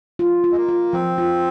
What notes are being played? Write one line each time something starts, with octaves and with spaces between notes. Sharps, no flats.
F4
F4
G#3
A#3
F4
F3 C4
F4